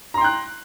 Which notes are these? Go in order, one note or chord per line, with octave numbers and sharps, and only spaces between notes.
G5 A#5 C6 F#6